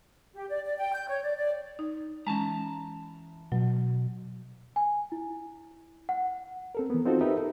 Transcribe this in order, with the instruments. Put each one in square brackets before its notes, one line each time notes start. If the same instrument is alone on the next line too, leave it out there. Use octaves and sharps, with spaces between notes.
[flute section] G4
D5
D5
G5
G6
C#5
D5
D5
[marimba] D#4
[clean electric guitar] E3 A5 A#5 [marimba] G#3 C#4
[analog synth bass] B2 [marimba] F#3
[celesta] G#5
E4
F#5
[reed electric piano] C4 A4 A#4
E3 B3
C4 D#4 F4 F#4 A4 C5
D#4 G4 A#4 B4 E5
A4